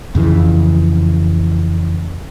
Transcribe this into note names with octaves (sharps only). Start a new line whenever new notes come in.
F2 C#3 E3